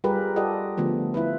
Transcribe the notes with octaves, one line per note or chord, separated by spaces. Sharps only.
G3 F4 G4 G#4 A#4 B4
F4 G4 A4 D5 D#5 F#5
D3 F3 A3 B3
E4 F4 B4